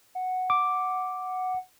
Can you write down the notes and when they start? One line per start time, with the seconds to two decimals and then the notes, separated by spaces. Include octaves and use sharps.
0.15 F#5
0.50 D6